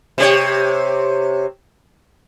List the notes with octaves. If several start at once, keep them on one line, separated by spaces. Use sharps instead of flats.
C3 G4 C#5